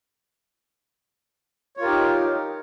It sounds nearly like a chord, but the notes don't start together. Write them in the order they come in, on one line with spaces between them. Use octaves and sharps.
C#5 F4 A#4 G4 D#4